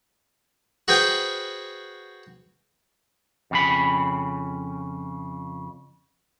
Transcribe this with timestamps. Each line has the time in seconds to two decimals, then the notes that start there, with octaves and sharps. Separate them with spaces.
0.88 F#4 G#4 B4 C5 G5
3.51 F2 C#3 B5